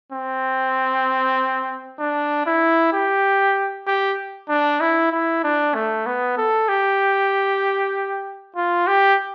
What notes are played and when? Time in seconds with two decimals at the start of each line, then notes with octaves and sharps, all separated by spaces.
0.12 C4
2.00 D4
2.46 E4
2.93 G4
3.87 G4
4.49 D4
4.81 E4
5.12 E4
5.43 D4
5.74 A3
6.06 B3
6.37 A4
6.69 G4
8.56 F4
8.87 G4